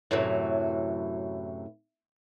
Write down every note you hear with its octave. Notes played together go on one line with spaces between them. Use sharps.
F#2 A2 C3 E3 F#3